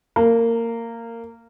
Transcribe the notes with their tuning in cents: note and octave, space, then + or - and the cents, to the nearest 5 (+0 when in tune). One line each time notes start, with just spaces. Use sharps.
A#3 -20